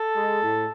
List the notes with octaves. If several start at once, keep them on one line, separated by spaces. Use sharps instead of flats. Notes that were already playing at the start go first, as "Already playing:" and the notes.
Already playing: A4
G#3
A2